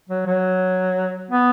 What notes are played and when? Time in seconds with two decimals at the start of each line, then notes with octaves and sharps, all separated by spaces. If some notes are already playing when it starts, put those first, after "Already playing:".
0.09 F#3
0.27 F#3
1.31 B3